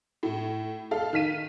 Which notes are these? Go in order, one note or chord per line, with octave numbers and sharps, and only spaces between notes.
A2
A4 F5
D#3 F6 B6 D#7